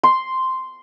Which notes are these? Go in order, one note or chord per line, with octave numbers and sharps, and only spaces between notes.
C6